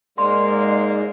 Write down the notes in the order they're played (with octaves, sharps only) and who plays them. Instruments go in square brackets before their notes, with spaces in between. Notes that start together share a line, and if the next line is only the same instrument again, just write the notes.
[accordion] G#2 G#3 [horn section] A#3 [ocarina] D5 [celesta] C6